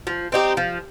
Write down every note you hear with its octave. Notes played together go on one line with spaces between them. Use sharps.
F3
C4 D#4 G4
F3